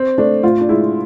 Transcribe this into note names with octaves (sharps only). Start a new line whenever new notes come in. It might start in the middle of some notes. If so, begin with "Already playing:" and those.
Already playing: C4
A3 D4
A2 F4
D4
G#3 E4